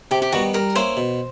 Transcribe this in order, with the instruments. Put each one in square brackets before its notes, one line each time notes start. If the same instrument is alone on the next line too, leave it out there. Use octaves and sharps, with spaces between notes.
[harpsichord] C3 [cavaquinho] G4
[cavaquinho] G4
[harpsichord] D#3 G3 B3 [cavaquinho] F#4
[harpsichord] G3 [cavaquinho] A#4
[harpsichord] A#3 C#4 E4 [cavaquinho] C5
[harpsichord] B2